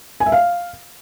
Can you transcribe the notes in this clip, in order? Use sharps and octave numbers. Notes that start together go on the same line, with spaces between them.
G#5
E5
F5